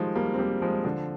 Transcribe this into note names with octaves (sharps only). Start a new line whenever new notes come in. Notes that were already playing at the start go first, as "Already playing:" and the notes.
Already playing: D#3 F3 G3 G#3
G3 A#3
C4
G3 A#3
F3 G#3
D3 F3